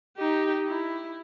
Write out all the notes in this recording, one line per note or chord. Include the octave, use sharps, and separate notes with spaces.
D#4 G4
E4